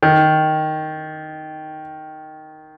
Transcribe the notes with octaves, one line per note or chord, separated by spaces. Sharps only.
D#3